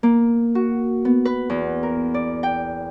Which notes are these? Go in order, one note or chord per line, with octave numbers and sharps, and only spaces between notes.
A#3
F#4
B3
B4
E2
A#4
D5
G5